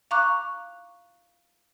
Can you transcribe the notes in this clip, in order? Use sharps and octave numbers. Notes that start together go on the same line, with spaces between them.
F5 A#5 C#6 D6 F#6